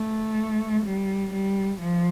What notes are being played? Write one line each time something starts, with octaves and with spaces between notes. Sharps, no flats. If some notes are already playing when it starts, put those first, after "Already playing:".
Already playing: A3
G3
G3
F3